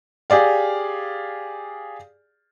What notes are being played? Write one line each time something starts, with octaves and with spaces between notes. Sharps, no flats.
G4 G#4 D5 F5